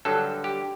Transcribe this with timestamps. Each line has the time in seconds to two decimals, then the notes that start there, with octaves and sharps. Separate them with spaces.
0.05 G2 D3 F#3 A4
0.44 G4